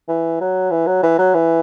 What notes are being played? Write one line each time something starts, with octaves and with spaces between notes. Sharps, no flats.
E3
F#3
E3
F#3
E3
F#3
E3